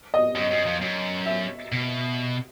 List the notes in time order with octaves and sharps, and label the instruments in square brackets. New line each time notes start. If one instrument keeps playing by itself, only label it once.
[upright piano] D#5
[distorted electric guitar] F#2
F#2
F2
F#2
[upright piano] E5
[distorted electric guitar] B2